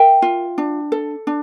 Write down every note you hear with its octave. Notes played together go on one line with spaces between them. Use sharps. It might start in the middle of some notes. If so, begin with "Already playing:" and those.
Already playing: A#4 E5 G5
F4
D4
A4
D4